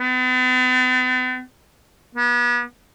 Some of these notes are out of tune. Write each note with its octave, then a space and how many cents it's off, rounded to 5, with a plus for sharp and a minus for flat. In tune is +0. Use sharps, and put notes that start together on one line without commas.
B3 +45
B3 -35